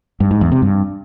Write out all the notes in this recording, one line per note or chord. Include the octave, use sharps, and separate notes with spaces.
G2
G#2
E2
C3
G2